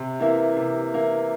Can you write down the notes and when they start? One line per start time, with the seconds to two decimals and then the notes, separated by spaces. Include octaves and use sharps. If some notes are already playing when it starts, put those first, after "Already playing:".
Already playing: C3
0.20 E3 A#3 E4
0.57 C3
0.93 E3 A#3 E4